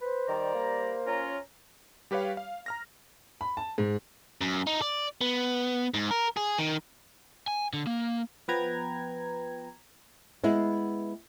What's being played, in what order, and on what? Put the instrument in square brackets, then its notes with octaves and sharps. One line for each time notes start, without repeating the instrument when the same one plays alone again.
[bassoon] B4 [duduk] C5
[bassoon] D#3 [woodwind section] G3 D5 A#5
[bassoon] A#3
[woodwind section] C#4 F4 A#5
[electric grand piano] G3 G4 B4 C#5 F5
F5
A#5 F6 A#6
[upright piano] B5
A5
G#2
[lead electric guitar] F#2
D#4
D5
B3
G#2
A#4
G#4
D#3
[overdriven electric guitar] G#5
D3
A#3
[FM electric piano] F3 B3 B4 G5 A#5 G#6
[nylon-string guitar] G#3 B3 E4